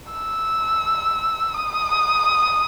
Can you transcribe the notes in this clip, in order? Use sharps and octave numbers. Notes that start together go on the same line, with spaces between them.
E6
D#6